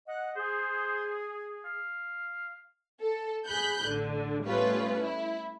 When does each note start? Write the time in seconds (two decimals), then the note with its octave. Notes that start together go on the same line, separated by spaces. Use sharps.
0.06 D#5 F#5
0.37 G#4 C5
1.65 F5
3.01 A4
3.47 G#4 B5 F#6 G6
3.85 A1 D3
4.45 G3 A3 B3 C#4 F4 B4
5.02 E4